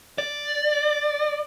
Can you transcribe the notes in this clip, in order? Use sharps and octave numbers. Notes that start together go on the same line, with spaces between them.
D5